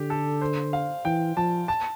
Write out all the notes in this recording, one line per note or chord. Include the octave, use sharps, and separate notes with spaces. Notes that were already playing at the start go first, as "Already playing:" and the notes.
Already playing: D3 G4
A4
C5
F5
E3 G5
F3 A5
A5